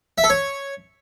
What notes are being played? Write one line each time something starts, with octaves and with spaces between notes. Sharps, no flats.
E5
A4
C#5